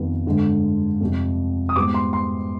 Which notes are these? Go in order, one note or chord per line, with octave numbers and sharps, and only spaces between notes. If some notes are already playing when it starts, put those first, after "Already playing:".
Already playing: F2 D#3 G3 B3
G2 D3 G#3
F2 C3 G3
D#6
G#2 G3 B3 D6
C6
C6